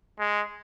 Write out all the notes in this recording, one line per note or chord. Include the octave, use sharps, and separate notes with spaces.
G#3